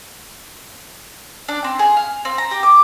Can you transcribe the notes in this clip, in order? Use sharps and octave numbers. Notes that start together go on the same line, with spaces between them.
D4
C4
G#4
F5
C4
A#5
G4
D6